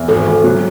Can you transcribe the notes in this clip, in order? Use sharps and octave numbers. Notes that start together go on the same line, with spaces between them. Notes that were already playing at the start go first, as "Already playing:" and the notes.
Already playing: E2
G#1 A4
G#1
F#3